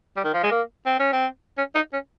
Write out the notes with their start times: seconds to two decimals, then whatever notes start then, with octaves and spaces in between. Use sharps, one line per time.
0.17 G3
0.24 D#3
0.34 F3
0.43 G#3
0.51 A#3
0.86 C4
0.99 C#4
1.13 C4
1.57 C#4
1.75 D#4
1.93 C#4